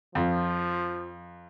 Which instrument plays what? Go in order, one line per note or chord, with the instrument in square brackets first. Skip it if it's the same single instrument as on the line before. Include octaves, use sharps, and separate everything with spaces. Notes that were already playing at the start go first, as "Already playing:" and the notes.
[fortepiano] F2 [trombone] F3